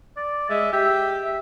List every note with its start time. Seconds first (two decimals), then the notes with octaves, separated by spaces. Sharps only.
0.17 D5
0.50 G#3 E5
0.73 G4 E5
1.24 E5